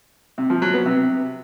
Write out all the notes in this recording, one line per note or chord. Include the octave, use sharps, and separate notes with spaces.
C3
F3
F#3
B3
C3